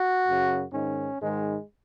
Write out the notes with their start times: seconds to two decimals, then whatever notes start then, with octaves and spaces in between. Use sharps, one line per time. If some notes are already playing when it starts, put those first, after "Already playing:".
Already playing: F#4
0.26 F#2 C#3
0.72 G#2 D#3 C#4
1.20 G#2 D#3 G#3